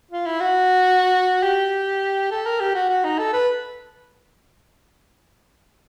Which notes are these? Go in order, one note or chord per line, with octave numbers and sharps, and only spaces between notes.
F4
E4
F#4
G4
A4
A#4
G4
F#4
F#4
D#4
A4
B4